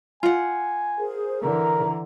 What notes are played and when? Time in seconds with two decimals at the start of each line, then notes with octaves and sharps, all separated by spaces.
0.23 F4 F#5 G#5
0.99 G#4 A#4 C5
1.42 D3 E3 A#4 A#5